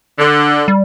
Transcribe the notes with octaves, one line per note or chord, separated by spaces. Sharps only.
D3
G3